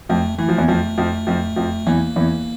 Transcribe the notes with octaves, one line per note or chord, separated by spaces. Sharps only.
F2 F3 A3
E3 A3
F3
E2 E3
F2 F3 A3
F2 F3
F2 F3
F2 F3
E2 E3 A#3
E2 E3